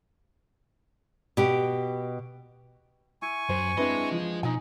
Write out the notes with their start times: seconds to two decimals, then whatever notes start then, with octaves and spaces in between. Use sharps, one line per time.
1.37 B2 G4
3.22 E4 G#5 C#6
3.49 F#2 C5
3.78 C4 D4 E4 G#4 B4 D#5
4.11 F3
4.43 B2 D#4 G#5